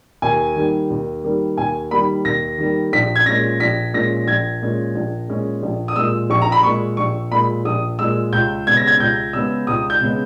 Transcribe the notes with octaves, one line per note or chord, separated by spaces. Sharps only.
D#2 G#5
D#3 G3 A#3
D#2
D#3 G3 A#3
D#2 G#5
D#3 G3 A#3 B5
D#2 A#6
D#3 G3 A#3
A#1 B6
G#6
A#2 G#3 C#4 A#6
A#1 B6
A#2 G#3 C#4 A#6
A#1 G#6
A#2 G#3 C#4
A#1
A#2 G#3 C#4
A#1
D#6
A#2 G#3 E6
A#1 C#6
A#5
B5
A#2 G#3 C#6
A#1 C#6
A#2 G#3 B5
A#1 D#6
A#2 G#3 E6
C#2 G6
C#3 G#3 B3 G#6
A#6
G#6
C#2 G6
C#3 G#3 B3 E6
C#2 D#6
G6
C#3 G#3 B3